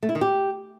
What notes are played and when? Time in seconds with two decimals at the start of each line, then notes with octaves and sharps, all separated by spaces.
0.03 A3
0.09 E4
0.15 D#3
0.21 G4